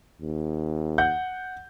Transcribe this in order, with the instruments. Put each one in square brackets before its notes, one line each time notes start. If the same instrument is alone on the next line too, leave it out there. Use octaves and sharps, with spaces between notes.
[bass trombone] D#2
[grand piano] F#5 G6